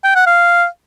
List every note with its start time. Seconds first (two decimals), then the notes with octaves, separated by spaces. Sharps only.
0.04 G5
0.15 F#5
0.27 F5